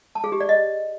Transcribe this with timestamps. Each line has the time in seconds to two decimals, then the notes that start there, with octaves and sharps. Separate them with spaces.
0.15 A5
0.24 G#4
0.32 G4
0.40 D5
0.49 D#5